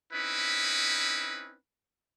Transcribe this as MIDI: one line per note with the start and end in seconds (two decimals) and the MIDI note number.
0.13 1.57 60
0.13 1.57 61
0.13 1.57 63
0.13 1.57 64
0.13 1.57 71